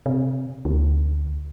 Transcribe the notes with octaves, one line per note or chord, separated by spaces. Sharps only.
C3
D2